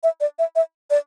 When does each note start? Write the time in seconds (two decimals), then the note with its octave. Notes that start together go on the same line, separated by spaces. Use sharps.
0.03 E5
0.21 D5
0.39 E5
0.56 E5
0.90 D5